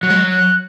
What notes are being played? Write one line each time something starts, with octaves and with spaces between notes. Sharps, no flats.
F#3 F#6
G#3
F#3
F#6